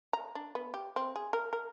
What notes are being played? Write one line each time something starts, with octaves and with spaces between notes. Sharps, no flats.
A#5
D4
B3
G4
C4
G#4
A#4
A#4